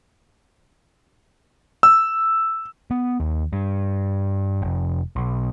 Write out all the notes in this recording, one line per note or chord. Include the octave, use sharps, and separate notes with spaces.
E6
B3
D#2
G2
F1
B1